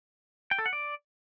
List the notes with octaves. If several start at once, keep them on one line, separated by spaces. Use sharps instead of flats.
G5
A4
F#5
D5